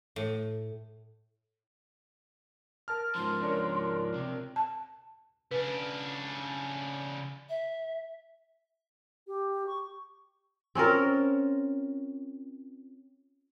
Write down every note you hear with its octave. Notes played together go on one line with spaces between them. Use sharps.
A2
A#4 A5 F6
G#2 F3 C6
D4 A#4 C#5
C3
A5
C#3 D4 B4
E5
G4
C#6
C4 C#4 F4 A#4